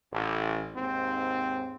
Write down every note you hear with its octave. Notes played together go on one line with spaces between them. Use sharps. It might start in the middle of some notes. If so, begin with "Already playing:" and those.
A1
D#2 G#2 C4